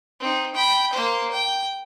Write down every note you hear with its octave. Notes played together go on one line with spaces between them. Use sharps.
C4 D#4
G5 B5
A#3 C5
G5